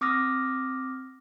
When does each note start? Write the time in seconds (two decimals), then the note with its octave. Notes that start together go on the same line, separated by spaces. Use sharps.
0.01 C4 D6 D#6 F6 A#6